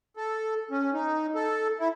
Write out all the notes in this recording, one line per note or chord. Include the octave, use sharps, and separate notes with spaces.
A4
C#4
D#4
A4
E4